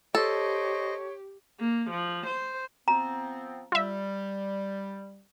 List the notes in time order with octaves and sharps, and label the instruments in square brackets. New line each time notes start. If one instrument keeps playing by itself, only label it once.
[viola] G4 [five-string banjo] A4 [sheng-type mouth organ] C5 D#5 [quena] C#5
[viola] A#3
F3
C5
[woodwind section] F3 B3 C4 [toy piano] A#5
[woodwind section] G3 [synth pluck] F4 E5